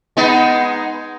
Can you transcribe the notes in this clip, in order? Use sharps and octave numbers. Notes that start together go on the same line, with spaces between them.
G#3 B3 D#4